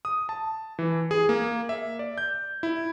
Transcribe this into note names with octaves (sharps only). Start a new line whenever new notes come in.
D#6
A5
E3
G#4
A#3
E5
D5
G6
E4